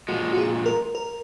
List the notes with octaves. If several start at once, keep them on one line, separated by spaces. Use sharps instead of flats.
A#2 F3 G#3 F#4
F#4
G#4
A#4
A#4